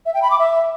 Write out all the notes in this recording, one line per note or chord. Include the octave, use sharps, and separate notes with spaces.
E5
G5
B5
D6
E5